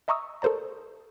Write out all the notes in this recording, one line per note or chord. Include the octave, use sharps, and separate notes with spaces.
D#5 E5 A#5 C#6 D#6 E6
A4 A#4 C5 D5 A#5